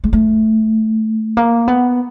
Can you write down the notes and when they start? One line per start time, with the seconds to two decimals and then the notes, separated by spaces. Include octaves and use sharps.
0.04 G#3
0.13 A3
1.37 A#3
1.68 B3